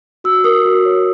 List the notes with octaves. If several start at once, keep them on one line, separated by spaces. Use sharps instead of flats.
F#4 E6
A#4 D#6
F#4
C#5